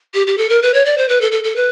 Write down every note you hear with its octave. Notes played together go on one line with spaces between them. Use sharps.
G4
G4
A4
A#4
B4
C#5
D5
C5
B4
A4
A4
A4
B4